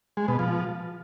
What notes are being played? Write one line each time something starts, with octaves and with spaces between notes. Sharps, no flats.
G#3
B2
F3